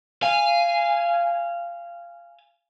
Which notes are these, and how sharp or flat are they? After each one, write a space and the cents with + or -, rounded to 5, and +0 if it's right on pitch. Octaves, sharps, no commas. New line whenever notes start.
F5 -15 G#5 -10